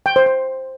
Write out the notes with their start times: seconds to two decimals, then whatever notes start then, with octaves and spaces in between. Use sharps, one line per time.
0.06 G5
0.16 C5
0.26 C5